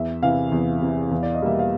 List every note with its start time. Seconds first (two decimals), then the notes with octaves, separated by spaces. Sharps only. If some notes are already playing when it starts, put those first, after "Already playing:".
Already playing: E2 E5
0.22 C3 E3 F5
0.52 E2
0.81 C3 E3
1.11 E2
1.23 D5
1.34 D#5
1.41 B2 G3 A#3 E5
1.59 F5